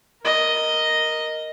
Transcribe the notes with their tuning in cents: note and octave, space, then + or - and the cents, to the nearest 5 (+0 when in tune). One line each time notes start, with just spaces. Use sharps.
A#4 +0 D#5 +0